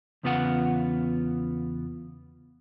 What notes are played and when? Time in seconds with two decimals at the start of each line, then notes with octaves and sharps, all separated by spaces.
0.23 E2 C#3 B3 F4 A#4 F#5